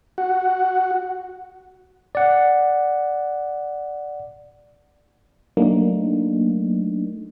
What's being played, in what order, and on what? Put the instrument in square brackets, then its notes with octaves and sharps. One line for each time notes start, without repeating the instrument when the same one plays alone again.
[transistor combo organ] F#4
[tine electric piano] D5 F#5
[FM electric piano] F#3 A3 A#3 D4 D#4